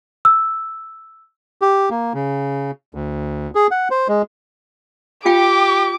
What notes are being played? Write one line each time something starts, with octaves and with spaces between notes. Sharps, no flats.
E6
G4
A#3
C#3
D2
G#4
F#5
C5
G#3
F4 G4 F5 G5 D6